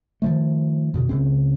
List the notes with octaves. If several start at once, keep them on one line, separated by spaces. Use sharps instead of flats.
D#3 F3 A3
F2 B2 D3
C#2 C#3 C4